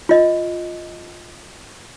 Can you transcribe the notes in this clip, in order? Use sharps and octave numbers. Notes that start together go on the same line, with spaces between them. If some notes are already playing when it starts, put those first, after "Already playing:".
F4 D#5